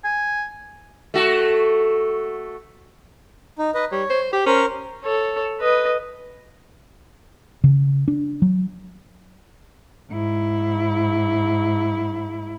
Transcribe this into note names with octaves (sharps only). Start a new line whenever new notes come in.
G#5
A3 F#4
D#4
B4 D#5
G3 C#5
C5
G4 G5
C#4 A#4 C5 C#6
A4 C#5
B4 D#5
C#3
D4
F#3
G#2 E4